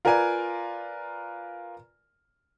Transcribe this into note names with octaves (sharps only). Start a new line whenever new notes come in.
F4 A#4 B4 D5 G#5